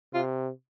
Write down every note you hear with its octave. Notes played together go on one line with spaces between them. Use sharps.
C3 F4